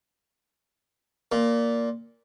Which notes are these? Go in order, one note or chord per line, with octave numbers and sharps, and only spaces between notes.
A#2